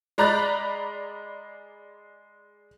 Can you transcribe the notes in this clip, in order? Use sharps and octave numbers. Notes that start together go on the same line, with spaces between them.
G#3 D5 A#5 B5 F#6 A6